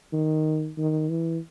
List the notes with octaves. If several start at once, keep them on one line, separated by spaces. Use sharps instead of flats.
D#3
D#3
E3